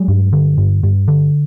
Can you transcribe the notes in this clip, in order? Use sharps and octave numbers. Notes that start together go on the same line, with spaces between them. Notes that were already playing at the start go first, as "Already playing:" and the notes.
Already playing: F#3 G#3
G2
D3
G2
G2
D3